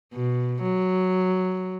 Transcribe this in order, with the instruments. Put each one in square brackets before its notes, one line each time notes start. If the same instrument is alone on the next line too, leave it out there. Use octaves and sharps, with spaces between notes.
[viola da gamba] B2
F#3